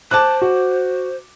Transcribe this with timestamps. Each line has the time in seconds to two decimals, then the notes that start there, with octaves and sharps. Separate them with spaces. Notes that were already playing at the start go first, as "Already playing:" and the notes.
0.11 C5 A5 D6 F#6
0.42 F#4